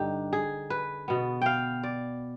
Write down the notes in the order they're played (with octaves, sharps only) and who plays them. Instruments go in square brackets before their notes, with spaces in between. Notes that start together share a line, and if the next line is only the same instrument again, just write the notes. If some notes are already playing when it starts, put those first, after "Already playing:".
Already playing: [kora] G2 D3 D#4 G4
G#4
B4
B2 B3
F5 G5
D5